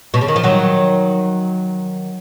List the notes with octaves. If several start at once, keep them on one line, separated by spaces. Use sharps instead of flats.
B2
C#3
D#3
F3
D#3 F#3